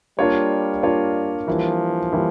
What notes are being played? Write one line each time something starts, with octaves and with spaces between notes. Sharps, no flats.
G3 A#3 D4 F4 C#5
A#3 D4 F4 C#5
E3 F3 G3 A#3 E4
E3 G3 A#3 E4